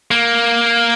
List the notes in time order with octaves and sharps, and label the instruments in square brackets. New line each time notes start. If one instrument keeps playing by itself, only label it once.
[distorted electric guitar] A#3